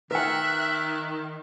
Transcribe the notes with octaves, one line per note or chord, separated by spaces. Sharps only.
D#3 A#4 B4 E5 G5 F#6